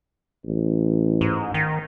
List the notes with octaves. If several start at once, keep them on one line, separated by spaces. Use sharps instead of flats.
A1
G#2
D#3